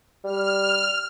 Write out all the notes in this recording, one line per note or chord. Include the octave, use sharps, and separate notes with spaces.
G3 F6